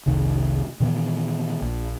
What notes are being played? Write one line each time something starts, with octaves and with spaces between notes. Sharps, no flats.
F1 C2 D#3
A#2 D#3 E3 B3
A#1